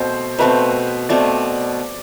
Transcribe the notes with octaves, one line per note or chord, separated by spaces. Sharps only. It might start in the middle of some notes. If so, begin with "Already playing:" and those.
Already playing: B2 A3 C4 C5
B2 A3 C4 B4
B2 A3 C4 D5